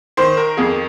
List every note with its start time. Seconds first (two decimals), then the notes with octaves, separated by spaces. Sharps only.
0.17 D#3 C5
0.37 A#4
0.57 F2 G#4